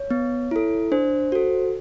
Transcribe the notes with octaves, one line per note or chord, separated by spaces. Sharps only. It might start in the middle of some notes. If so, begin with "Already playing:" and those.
Already playing: C#5
B3
E4 A4
D4 C5
F#4 A4